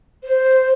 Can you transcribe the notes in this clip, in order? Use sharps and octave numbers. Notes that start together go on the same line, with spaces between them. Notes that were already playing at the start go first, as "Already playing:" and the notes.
C5